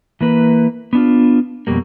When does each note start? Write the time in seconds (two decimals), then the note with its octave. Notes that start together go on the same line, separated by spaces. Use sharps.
0.21 E3 A#3 B4
0.93 B3 D4 F4
1.67 F2 B2 G3 A#3